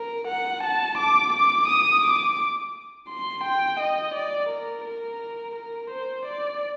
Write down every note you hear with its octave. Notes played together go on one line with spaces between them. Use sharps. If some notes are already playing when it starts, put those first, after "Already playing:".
Already playing: A#4
F#5
A5
D6
D6
D#6
D6
C6
G5
D#5
D5
A#4
A#4
A#4
C5
D5